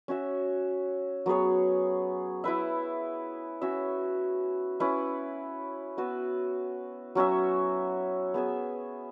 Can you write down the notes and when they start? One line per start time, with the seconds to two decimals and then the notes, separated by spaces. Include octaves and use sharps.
0.08 C#4 F#4 E5
1.26 F#3 B3 G#4 C#5
2.44 E4 B4 E5
3.62 C#4 F#4 E5
4.80 C#4 E4 B4
5.97 B3 F#4 B4 E5
7.15 F#3 C#4 F#4 E5
8.34 B3 G#4 E5